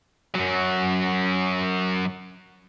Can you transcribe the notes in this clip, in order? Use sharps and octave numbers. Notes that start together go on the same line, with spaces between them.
F#2 F#3